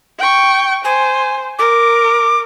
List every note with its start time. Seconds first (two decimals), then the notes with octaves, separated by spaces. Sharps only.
0.19 G5 C#6
0.84 C5 G#5
1.59 A#4 D6